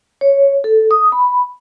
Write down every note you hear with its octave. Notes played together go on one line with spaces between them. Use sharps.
C#5
A4
D#6
B5